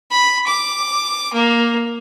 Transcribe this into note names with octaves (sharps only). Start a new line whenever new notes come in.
B5
D6
A#3